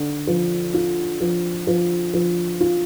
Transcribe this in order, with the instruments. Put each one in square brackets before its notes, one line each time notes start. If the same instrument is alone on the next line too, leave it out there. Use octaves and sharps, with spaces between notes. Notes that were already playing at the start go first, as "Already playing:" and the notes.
Already playing: [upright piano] D3
F3
F4
F3
F3
F3
F4